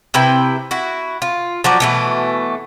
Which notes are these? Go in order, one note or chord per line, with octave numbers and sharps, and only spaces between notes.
C3 E4 B4 G5
E4 F#4
F4
F3 F#3 F#4 D5
B2 E3 A3